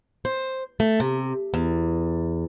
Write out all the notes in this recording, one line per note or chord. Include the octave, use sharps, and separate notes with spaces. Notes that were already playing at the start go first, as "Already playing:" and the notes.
C5
A3
C3
E2